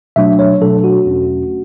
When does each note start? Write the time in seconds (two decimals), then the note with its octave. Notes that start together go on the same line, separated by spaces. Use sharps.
0.16 B2 F#3 A3 D4 E5
0.39 C#5
0.61 B2 F#3 A3 D4 A4
0.84 F#4
1.06 E2 B2 A3 C#4